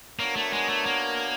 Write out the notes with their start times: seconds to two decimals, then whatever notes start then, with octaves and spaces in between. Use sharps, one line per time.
0.19 A#3 B3 D4 F#4 A#4 C#5
0.36 A3
0.53 G#3
0.69 A3
0.86 A#3